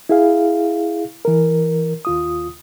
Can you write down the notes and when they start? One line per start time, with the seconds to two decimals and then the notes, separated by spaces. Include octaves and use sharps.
0.09 E4 G#4 F5
1.25 E3 A#4
2.05 D#2 F4 D#6